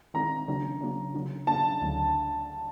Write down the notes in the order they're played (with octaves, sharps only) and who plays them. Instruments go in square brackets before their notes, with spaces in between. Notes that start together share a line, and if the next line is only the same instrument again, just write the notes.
[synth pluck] D#3 G#3 C4 D#4 [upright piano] A#5
[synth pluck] C#3 F#3 A#3 D4
C#3 F#3 A#3 D4
C#3 F#3 A#3 D4
[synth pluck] C#3 F#3 A#3 D4 [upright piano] A5
[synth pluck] D2 D3 F#3 A3 D4